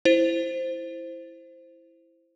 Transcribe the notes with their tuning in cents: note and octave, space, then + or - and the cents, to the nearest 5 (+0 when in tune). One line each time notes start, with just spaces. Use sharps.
E4 +10 C5 +0